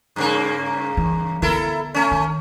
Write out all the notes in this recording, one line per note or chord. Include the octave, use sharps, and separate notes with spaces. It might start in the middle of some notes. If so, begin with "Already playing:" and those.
G2 C#3 A#3
E3
D3 B3 E4 A4 A#4
A3 C#4
D#3